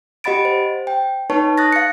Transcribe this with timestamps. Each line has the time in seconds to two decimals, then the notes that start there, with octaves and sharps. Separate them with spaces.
0.24 G4 D#5 F#5 B5 A6 D7
0.45 C5
0.87 G5
1.30 D#4 B4 C#5 A5 C#6
1.58 D#6 F#6 A6 A#6
1.72 F5 C#7